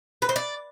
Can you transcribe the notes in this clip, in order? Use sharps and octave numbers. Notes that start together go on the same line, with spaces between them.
B4
C5
D5